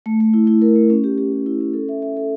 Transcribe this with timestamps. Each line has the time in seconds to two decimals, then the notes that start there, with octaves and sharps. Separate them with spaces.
0.06 A3
0.20 A3
0.34 E4
0.47 E4
0.62 A#4
0.76 A3
0.90 C#4
1.04 G4
1.18 G4
1.32 G4
1.46 E4
1.61 C#4
1.73 A4
1.89 E5
2.02 E5
2.17 A4